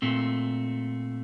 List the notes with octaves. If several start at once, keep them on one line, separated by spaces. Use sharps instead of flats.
A#2 A3 C4